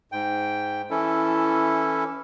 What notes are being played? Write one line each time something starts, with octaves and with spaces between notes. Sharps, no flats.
G#2 G5
E3 C#4 E4 A4